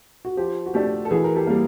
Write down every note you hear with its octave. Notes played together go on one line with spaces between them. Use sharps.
F#4
F3 G4
F#4
A3 D4 G4
A4
E3 F#4 G#4
A#4
G4 A4
G3 A#3